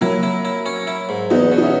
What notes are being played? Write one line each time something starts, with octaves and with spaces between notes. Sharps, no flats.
F#3 A#3 E4
E4
E4
C#4
E4
G#2
E2 B3 D#4
B2
D#4
C#4 E4